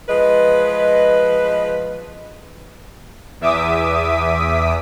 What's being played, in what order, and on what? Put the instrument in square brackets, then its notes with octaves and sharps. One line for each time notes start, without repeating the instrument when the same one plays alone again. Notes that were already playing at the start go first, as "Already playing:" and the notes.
[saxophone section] F3 G#3 B4 [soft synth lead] D#5
[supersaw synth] E2 E5 D6 D#6 B6